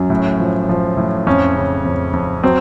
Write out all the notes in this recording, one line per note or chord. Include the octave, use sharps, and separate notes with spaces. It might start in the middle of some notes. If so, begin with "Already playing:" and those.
Already playing: F#2 F#3
A2
F3
F3
A2
F2 C#4
C#3
F2
F2
F#3 C4